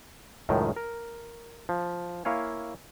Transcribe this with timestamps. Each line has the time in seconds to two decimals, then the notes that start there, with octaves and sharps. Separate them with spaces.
0.49 C#2 F#2 A2 D#3
0.76 A#4
1.69 F3
2.25 A#3 E4 C#5 F5 G#5